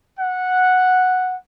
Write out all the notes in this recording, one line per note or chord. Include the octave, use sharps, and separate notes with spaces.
F#5